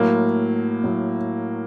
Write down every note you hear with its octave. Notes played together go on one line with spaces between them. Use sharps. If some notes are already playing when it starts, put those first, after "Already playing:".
Already playing: A2 F#3 A#3
A2 F#3